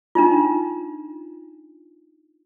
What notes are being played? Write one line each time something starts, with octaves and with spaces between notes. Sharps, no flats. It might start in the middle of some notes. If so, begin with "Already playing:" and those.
D4 D#4 F4